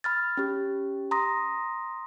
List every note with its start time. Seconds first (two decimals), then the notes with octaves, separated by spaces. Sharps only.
0.04 B5 F6 A6
0.37 C#4 G4
1.11 A#5 C6 D#6 A#6